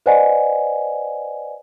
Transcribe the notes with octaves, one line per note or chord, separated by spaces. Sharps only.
B4 C5 D5 D#5 F#5 G#5